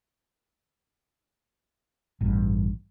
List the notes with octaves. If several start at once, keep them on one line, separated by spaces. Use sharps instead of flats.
A1 G2